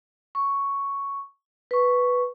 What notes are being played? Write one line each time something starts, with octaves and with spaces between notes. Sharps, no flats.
C#6
B4 C#6